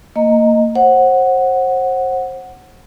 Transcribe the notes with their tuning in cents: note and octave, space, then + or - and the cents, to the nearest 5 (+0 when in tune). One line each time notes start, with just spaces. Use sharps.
A#3 -25 D#5 +0 A#5 +0
C5 +30 F#5 +0